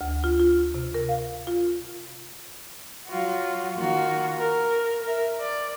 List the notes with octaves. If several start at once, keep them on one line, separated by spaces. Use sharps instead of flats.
D2
F4
F4
C3
A#4
F5
F4
F#3 F4 F#4
D#3 A#3 F4 F#4
A#4
A#4 E5
D5